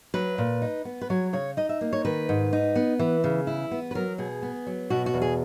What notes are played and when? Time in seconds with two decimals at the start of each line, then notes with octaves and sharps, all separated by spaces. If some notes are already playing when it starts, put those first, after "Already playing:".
0.14 F#3 B4
0.38 A#2
0.62 D#4
0.85 B3
1.01 B4
1.10 F#3 C#5
1.33 C#3 C#5
1.57 D#4 D#5
1.69 E5
1.81 A#3
1.93 C#5
2.05 D#3 B4
2.29 G#2
2.53 D#4
2.76 B3
2.99 E3
3.24 C#3
3.47 E4
3.71 B3
3.91 B4
3.95 F#3 A#4
4.18 B2 G#4
4.42 B3
4.66 F#3
4.90 B2 F#4
5.06 F#4
5.14 E2
5.22 G#4